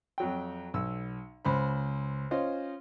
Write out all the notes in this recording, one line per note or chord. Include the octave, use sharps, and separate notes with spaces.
F2 F#3 G5
B1 E6
C#2 C5 B5
C#4 F4 C5 D#5